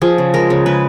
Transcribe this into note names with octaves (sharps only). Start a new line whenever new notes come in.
F3 G#4
C#3
G#3 A#4
C#3
G#3 B4